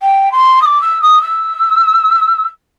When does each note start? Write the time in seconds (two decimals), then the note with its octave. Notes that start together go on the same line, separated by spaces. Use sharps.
0.02 G5
0.32 C6
0.62 D#6
0.66 D6
0.82 E6
1.02 D#6
1.22 E6